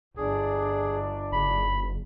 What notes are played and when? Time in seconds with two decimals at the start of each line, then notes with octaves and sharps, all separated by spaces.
0.17 G1 D4 G#4
1.32 F#1 B5